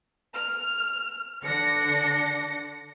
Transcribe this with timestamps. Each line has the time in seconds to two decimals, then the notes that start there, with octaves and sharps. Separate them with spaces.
0.34 F6
1.44 D3 D4 A#6 C#7